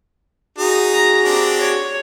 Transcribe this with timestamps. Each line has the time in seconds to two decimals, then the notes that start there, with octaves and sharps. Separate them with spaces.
0.58 D#4 F#4 G#4
0.94 A#5
1.24 C4 D4 G4
1.59 C#5